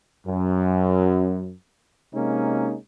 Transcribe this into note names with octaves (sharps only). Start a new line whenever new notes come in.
F#2
C3 G#3 A#3 C#4 D#4